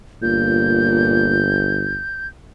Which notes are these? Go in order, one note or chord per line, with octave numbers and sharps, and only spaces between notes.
G1 A#2 G6